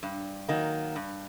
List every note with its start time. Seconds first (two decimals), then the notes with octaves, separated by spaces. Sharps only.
0.03 G2
0.48 D#3 F#3 A#3
0.96 G2